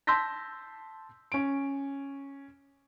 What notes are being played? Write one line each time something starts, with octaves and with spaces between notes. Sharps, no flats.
A5 C6 E6 G6 A#6 B6
C#4 D7